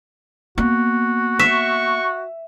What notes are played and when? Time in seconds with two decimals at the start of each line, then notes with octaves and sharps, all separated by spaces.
0.58 A#3 B3 F#4
1.39 E5 C#6